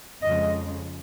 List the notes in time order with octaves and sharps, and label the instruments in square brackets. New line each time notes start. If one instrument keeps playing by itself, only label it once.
[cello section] F2 C#3 F3 G#3 D#5